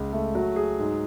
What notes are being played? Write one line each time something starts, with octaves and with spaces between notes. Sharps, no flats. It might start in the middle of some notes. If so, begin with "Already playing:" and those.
Already playing: C#2
A3
F#3
G#4
G#2